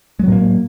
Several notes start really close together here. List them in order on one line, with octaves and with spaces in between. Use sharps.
G#3 F#3 A2 A#3